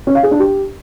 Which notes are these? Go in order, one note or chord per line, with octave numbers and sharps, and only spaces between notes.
C#4
F5
G#4
D4
G4